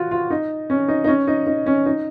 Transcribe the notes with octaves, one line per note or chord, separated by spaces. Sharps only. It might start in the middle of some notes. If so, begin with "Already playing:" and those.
Already playing: F4 F#4
F4
D#4
C#4
D#4
D#4
C#4
D#4
D#4
C#4
D#4